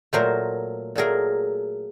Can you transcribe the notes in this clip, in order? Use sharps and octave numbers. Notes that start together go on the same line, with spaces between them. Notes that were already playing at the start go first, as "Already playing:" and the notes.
A#2 F#3 A3 A#4 C5
A#2 F#3 A3 G#4 A#4